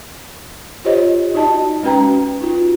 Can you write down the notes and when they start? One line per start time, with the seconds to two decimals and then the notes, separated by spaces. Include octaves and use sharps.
0.85 F4 G4 C5 C#5 D#5
1.34 D#4 F#4 D5 D#5 A5
1.83 G#3 C#4 F#4 B4 G5 A#5
2.41 D#4 F4 F#4